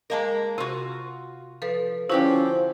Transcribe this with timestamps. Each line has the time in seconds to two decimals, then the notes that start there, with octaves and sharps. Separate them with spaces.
0.10 G#3 A#3 A#4 D#5 F5 A5
0.58 C3 F4 F#4
1.62 F3 A4 B4
2.10 D3 F3 C#4 E4 F#4 G4 G5